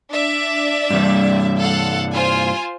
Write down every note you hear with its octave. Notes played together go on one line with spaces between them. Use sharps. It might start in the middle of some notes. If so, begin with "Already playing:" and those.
D4 D5 E5
G2 C3 G3
A4 F5 F#5
F4 C5 G#5